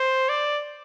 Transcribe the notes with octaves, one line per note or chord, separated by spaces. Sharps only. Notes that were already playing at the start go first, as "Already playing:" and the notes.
Already playing: C5
D5